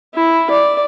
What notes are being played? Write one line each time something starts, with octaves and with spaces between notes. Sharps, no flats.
E4
D5